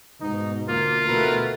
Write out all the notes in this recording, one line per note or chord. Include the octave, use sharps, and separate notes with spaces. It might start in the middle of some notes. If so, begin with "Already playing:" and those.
G#2 B2 D#4
D2 A#3 F4
B2 E3 A3 A#4 B4